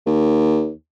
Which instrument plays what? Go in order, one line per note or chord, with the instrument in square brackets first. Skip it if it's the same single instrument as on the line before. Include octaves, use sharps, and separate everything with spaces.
[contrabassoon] D#2